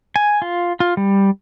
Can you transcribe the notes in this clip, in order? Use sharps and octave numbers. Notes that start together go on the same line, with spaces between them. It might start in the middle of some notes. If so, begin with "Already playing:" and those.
G#5
F4
F4
G3